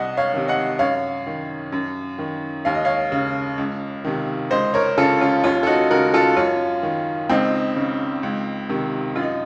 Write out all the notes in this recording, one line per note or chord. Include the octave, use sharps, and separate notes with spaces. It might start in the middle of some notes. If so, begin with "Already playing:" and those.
Already playing: C2 D#5 F#5
C#5 F5
C3 D#3
D#5 F#5
F#2 C#5 F5
D#3
F#2
D#3
D#2 F5
D#5
C#5 F5
C#3
C#2
C3 D#3
C#2 C5 D#5
A#4 C#5
C#3 F4 A4
C#4 F4
D#2 C#4 F4
A4
D#4 F#4
C#3 F#4 A#4
F4 A4
F#2 C#4 F4
D#3
C#2 C4 D#4
C#3
C#2
C3 D#3
F#2 F4
D#4